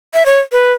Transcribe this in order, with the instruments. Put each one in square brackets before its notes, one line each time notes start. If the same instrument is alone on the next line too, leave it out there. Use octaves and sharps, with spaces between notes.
[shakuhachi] E5
C#5
B4